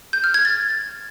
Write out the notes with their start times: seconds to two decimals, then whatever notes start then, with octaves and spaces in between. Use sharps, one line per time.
0.13 G6
0.24 F6
0.34 G#6
0.45 A6